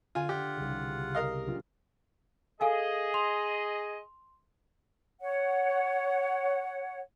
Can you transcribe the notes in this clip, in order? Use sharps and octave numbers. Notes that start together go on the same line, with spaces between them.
D3 F4 G#5
F4 G4 F#5
C2 C#3
A#4 D#5 F5
B1 C#4 F4
G#4 A4 D#5 F5 G#5
C6 F7
C#5 F#5